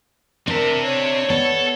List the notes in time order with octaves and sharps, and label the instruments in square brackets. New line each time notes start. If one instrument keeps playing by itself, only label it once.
[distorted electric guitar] C4 E5 [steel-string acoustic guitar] D4 [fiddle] A#4
[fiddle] C#5
[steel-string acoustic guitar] B3 [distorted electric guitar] A4